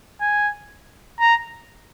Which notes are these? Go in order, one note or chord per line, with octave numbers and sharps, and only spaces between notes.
G#5
A#5